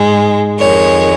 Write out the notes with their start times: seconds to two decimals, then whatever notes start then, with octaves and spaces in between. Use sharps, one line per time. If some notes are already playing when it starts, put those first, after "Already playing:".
Already playing: G#2 G#3
0.58 F2 D#3 G#3 C#5